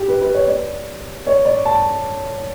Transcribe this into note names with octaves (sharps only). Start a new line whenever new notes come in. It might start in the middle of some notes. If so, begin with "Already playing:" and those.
Already playing: G4
B4
B4
C#5
D5
C#5
D5
A5